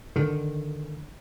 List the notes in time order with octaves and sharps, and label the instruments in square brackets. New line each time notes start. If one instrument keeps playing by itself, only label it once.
[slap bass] D3 D#3